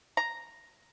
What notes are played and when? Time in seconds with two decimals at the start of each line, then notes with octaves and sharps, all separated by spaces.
0.17 A#5